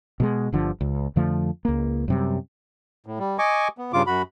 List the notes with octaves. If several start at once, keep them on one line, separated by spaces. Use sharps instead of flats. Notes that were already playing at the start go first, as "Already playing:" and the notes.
B2 G3 G#3
G1 D3 F3
C#2
F2 D3 F3 A3
C#2 A#3
F#2 C3 G3
A2
G3
D#5 G#5 C#6 D6
B3
G2 C#3 F4 D6
F#2 F#4 B5